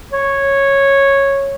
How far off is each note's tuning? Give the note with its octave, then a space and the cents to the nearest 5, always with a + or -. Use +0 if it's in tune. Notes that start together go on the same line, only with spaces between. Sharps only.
C#5 -10